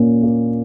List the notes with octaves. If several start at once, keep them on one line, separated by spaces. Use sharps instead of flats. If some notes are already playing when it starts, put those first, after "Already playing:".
Already playing: A#2 A#3 C#4
A#3